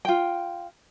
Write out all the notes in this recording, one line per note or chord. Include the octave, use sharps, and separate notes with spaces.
F4 G5